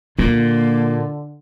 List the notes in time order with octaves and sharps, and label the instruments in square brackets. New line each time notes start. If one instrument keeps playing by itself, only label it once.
[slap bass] A#2 [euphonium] D3 [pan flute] A#3 [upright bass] F4